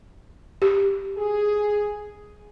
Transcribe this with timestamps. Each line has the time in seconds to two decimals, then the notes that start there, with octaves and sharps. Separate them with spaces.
0.62 G4
1.17 G#4